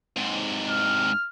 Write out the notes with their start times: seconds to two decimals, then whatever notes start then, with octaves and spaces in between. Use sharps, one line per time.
0.17 G#2 C3
0.70 F6